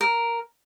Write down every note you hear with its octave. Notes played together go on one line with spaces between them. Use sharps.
A#4